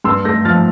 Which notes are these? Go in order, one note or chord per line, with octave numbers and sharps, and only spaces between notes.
G2 C6 E6
A3 G6 A#6
F3 F6 A6